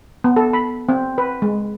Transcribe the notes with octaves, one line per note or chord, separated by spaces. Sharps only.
B3
A4
B5
C4
B4
G#3